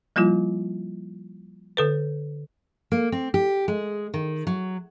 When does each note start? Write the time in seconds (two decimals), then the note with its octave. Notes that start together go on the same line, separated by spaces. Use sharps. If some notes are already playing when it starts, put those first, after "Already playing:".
0.16 F3 G3 A#3 E4 F4
1.77 D3 A4 B4
2.92 A#3
3.12 C4
3.34 G4
3.68 G#3
4.14 D#3
4.47 F#3